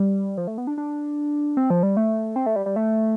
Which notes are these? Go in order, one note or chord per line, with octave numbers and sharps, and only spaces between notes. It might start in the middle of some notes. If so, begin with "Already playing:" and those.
Already playing: G3
F3
A3
B3
D4
D4
C4
F3
G3
A3
C4
A3
G3
G3
A3